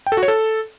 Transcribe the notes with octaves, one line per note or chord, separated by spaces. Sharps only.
G5
A4
F#4
C#5
A4